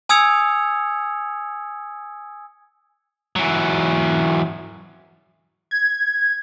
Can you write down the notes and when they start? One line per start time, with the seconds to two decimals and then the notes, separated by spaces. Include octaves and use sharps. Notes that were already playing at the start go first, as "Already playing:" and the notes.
0.09 G#5 D#6 E6 G#6 C#7 F7
3.36 E3 F#3
5.71 G#6